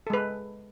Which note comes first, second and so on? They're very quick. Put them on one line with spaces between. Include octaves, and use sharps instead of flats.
A4 G#3 B4